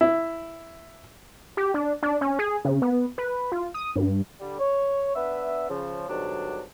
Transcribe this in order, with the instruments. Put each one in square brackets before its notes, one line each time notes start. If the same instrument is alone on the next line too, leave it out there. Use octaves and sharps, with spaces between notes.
[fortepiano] E4
[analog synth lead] G4
D4
D4
C#4
G#4
C#3
B3
B4
F4
D#6
G2
[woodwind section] D3 G3
C#5
B3 D4 B4 E5
C#3 F3
G#2 B2 D3 F#3 G3 D4